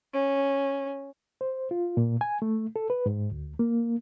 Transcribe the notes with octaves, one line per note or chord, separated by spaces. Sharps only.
C#4
C5
F4
A#2
G#5
A3
A4
B4
G#2
D2
A#3